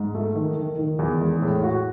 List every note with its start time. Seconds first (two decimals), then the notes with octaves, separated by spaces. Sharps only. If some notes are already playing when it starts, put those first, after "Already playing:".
Already playing: G#2
0.14 A3
0.36 D#3
0.57 D#3
0.78 D#3
0.99 E2
1.21 G#3
1.42 A2
1.64 F#4